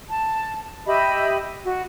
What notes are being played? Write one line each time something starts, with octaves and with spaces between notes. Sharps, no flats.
A5
G4 D#5 E5 B5
F#4